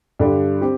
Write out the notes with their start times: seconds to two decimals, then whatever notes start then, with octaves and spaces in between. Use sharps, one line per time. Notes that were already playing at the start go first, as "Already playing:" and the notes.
0.19 G2 D3 G3 D4 G4
0.62 C4 G4